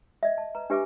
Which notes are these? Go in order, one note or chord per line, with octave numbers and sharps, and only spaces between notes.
D#5 E5
A5
B4 A#5
D4 G4 B4 E5 G#5 D6